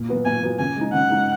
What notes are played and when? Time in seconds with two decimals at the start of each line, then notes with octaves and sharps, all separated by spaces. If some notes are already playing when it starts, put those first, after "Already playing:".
Already playing: A#2
0.09 F#3 B3 F#4
0.25 A#2 G#5
0.43 F#3 B3 F#4
0.59 C#3 G#5
0.76 G#3 D#4
0.93 C#3 F#5
1.10 G#3 D#4